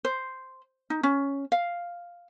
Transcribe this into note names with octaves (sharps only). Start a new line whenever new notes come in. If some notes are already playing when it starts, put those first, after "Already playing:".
C5
D#4
C#4
F5